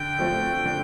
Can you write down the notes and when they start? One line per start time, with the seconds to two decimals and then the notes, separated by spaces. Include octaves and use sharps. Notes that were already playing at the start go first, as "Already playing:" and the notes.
Already playing: D3 G5
0.19 F3 A3 C4
0.65 D3